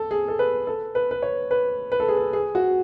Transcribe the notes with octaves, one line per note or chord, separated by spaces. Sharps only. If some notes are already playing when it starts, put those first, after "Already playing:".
Already playing: A4
G#4
A4
B4
A4
B4
B4
C#5
B4
B4
A4
G#4
A4
G#4
F#4